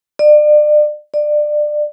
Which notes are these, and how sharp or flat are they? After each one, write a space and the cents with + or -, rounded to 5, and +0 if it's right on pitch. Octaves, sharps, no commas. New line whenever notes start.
D5 +35
D5 +25